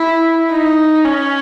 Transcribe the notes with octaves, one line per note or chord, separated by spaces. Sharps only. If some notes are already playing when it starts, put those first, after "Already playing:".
Already playing: E4
D#4
C#4